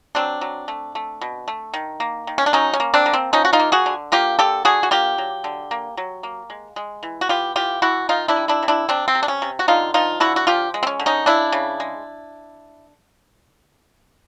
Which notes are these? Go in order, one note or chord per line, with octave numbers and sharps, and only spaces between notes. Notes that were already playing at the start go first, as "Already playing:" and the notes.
F#3 C4 D4
F#3
A3
A3
B2
A3
D#3
A#3
D#3
C#4
D4
F#3 C#4 D#4
C#4
A#3
C4 D4
A#3
C4
F3 C#4 D#4
F#4
D#4 F4
A#3
F#4 G#4
D3
A#3 F4 G4
D3 G4 A4
D3 F#4 G#4
F#4
A#3 F4 G4
F#3
D3
A#3
F#3
A#3
G#3
G#3
E3
F#4
B3 F4 G4
E3 F4 G4
E3 E4 F#4
D#3 D#4 F4
D4 E4
G3
D4 E4
C3
D4 E4
C3 C4 D4
C4
C3
D4
C#4
C3
F#4
D3 D#4 F4
F3 D#4 F4
D3 E4 F#4
F#4
F3 F4 G4
G#3
C4
C#4
D3
C#4 D#4
C#3 D4 E4
C#3
G#3